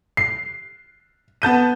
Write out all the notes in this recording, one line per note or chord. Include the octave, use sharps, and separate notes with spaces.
C7
B3 A5 G6 D#7